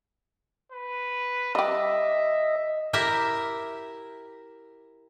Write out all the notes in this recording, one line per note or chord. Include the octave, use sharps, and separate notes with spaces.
B4
G3 G4 D#5 E5
E4 G4 A#4 E5